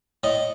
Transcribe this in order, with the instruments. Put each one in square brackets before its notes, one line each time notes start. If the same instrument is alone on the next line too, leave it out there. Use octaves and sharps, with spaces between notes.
[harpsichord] A2 D#5